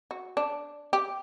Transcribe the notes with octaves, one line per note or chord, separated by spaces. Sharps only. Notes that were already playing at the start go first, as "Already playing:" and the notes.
F#4
D4
G4